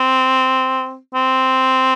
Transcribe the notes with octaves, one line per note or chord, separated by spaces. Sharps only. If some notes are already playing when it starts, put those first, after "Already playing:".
Already playing: C4
C4